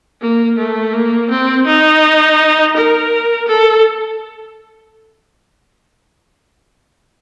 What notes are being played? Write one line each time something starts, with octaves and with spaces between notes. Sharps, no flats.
A#3
A3
A#3
C4
D#4
A#4
A4